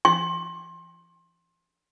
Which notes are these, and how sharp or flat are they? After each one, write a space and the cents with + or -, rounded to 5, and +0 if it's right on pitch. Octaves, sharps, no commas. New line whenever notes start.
C6 +25